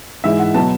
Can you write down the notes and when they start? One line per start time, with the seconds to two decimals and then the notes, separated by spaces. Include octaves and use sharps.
0.24 G#2 E3 G#3 E5
0.39 F#5
0.54 B2 F#3 B3 A5